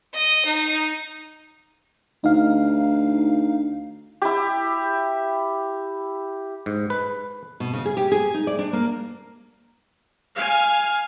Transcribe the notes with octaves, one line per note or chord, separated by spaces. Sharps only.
D#5
D#4
D2 D#4 F5
E4 G4
G#2
B4
B2
C#3
G#4
G4
G#4
D#4
D5
D4
A#3
F5 G#5